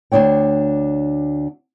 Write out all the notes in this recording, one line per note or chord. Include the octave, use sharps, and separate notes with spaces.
D2 D#3 D4 C#5 G5